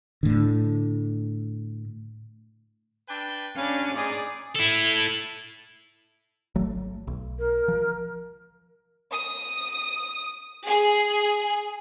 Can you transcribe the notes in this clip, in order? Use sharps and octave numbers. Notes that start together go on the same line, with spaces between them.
A2 D3
D4 B4 G5
G3 C#4 D4 F5
G#2 D#4 G#4 D5
E4 A4
G#1 F#3 A3
B1
A#4
F3
D#6
G#4